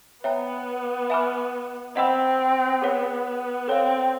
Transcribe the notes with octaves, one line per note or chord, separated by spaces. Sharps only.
B3 C#5 E5 G5 A#5
E5 G#5 B5 D6 F6
C4 D#5 F#5 B5 E6
B3 G#4 C#5 F#5
C4 A4 C#5 F5